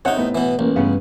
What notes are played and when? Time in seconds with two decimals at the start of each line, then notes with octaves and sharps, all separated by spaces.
0.05 C3 D#4 C#5 F#5
0.17 A2 B3
0.35 B2 E3
0.59 A1 A#3
0.76 G2 C#3 B3